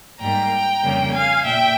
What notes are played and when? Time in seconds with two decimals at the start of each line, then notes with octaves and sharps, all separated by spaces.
0.20 G#2 G3 A#3 G5 A#5
0.83 F2 C#3 G3 A#3
1.14 F5 G#5
1.44 A#2 E5 G5